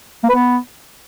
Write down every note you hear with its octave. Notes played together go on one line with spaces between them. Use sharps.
A#3
B4
B3